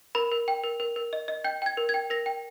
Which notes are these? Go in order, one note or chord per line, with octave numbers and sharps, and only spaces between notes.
A#4 B5
A#4
G5
A#4
A#4
A#4
D#5
D#5
G5 G6
G5 G#6
A#4
G#6
G5
A#4 A#6
G5